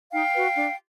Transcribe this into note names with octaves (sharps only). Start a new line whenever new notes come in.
D#4 F5 G5
F#4 B4
D4